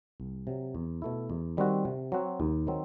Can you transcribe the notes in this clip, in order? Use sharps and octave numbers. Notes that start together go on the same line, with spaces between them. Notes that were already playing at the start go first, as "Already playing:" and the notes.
C2
C3 F#3
E2
B2 A3 E4
E2
D#3 G3 C4 F#4
C3
F#3 C4 F#4
D#2
D#3 F#3 C4